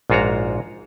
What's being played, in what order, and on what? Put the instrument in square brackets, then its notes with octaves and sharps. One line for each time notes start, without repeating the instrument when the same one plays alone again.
[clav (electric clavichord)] A#1 G#2 F4 F#4 C#5 A#5